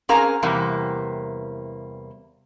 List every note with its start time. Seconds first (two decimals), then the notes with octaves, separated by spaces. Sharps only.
0.09 C4 C#4 G#4 A#4 F5 A#5
0.43 E2 C3 G3 A#3